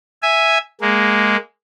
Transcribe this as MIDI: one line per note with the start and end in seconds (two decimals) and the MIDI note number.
0.22 0.58 76
0.22 0.58 80
0.81 1.36 56
0.81 1.36 58